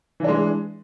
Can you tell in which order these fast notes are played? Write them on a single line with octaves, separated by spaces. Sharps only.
E3 D4 G#3